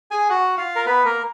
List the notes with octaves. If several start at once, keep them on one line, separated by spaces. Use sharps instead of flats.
G#4 G#5
F#4 F#5
F4 F5
A#4
B3 B4
A#3 A#4